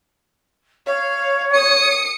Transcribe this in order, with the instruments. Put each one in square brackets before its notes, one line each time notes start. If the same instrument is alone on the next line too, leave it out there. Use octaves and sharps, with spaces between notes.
[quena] C#5 [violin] F5
[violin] D#6 C#7